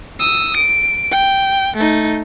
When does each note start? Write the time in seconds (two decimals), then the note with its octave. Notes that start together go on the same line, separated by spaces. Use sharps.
0.19 D#6 E6
0.56 D7
1.11 G5
1.76 A3 D#4